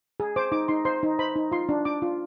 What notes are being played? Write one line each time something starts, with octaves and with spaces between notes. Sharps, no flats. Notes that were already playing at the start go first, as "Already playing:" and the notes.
G#4
C5 D6
D#4 D6
D#4 C6
C5 C6
D#4
C5 B5
D#4
F4 C6
D4
D4 D6
F4